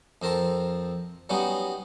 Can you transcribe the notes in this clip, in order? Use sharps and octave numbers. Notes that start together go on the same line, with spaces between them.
F2 C4 A#4 A5 C6
F#3 G3 B3 C#4 D#4 F#4